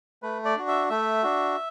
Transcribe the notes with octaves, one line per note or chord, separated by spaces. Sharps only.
A3 B4
D5
D4 F#4
E5
A3 E5
D4 F#4